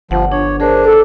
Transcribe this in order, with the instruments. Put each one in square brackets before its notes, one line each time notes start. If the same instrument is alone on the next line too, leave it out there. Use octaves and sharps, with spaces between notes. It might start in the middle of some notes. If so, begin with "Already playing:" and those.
[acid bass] G1 [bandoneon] F3 [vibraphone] F#5
[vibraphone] D4 [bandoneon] C#5
[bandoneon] D4 [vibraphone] G#4 A#4 C5
[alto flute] A4 [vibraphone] D6